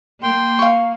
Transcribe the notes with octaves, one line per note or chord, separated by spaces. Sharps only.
A#3 G5 C6
F5 C#6